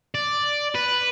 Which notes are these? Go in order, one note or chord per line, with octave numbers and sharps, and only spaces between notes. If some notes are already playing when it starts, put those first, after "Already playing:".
D5
B4